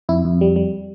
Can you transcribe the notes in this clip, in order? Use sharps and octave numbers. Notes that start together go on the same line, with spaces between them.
F2 E4
F2
G3
G3